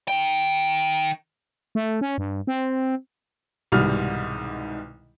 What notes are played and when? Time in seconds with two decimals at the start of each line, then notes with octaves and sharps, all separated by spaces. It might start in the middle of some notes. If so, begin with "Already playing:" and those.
0.08 D#3 G5
1.75 A3
2.01 C#4
2.18 G2
2.47 C4
3.72 C2 G#2 B2 D#3 G3 F6